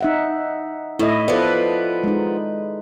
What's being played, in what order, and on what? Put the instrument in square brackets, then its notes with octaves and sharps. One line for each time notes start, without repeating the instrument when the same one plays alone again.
[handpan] D#4 E5 F#5
[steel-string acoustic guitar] A2 [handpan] E4 D#5
[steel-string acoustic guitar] F3 B3 [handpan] A4 B4 D5
[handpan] G#3 D#4